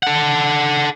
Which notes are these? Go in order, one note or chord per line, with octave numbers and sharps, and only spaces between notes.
A4 F#5